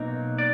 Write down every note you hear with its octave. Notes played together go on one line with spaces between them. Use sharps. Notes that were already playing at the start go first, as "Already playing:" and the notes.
Already playing: B2 F#3 A#3 D#4
D5